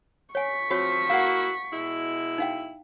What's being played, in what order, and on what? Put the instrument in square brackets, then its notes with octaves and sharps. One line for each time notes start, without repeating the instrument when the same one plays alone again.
[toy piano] C#5 G#5 [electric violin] C#6 B6
[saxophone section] F3 C4 [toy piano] F#4 C#5
[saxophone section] A#3 E4 F#4 [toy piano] F5 F#5
[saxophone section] B2 G#3 E4
[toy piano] D#4 F5 G5